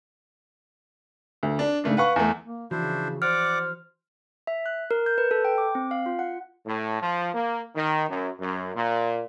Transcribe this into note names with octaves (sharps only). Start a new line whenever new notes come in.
D2
D4
G#2 C#3 A3 D4
B4 F5 F#5 B5 C#6
E2 A3
A#3
C#3 E3 F3 D4 E4 F#4 C5
C5 D5 F#5 D6 F6
E5
F#6
A#4
G6
B4
A4
G5
D6
C4
F5
F4
F#5
A2
F3
A#3
D#3
F#2
F#2
A#2